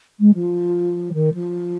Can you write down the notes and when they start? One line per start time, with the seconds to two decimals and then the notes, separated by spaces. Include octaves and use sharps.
0.20 G#3
0.34 F3
1.14 D#3
1.34 F3